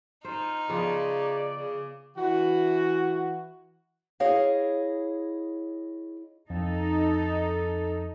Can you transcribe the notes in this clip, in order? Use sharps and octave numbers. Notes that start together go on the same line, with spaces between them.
D#4 F4 C5
C#3 F3 B3 F4 D5
C#3
E3 F#4
E4 G#4 C#5 D#5 F5
F2 D#4 A4